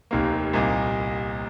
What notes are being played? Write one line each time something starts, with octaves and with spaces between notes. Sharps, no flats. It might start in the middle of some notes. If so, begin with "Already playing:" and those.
F1 D#2 D#3 A#3
C2 A#2 A#3 D#4